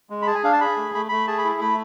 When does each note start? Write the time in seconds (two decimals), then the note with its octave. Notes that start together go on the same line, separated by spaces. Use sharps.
0.10 G#3
0.22 B5
0.27 G#4 A5
0.35 G#5
0.43 D4 F5
0.53 A5
0.61 G#4 B5
0.77 A3
0.95 A3 B5
1.09 A3 B5
1.27 G#4 A5
1.38 B5
1.45 E4
1.61 A3 B5